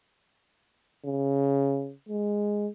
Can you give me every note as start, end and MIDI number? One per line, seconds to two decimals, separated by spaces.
1.05 1.93 49
2.09 2.69 56